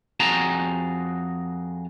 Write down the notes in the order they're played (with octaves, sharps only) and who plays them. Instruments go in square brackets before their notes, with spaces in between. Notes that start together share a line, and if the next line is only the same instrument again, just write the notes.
[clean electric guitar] F2 F#4 G#4 A5 A#5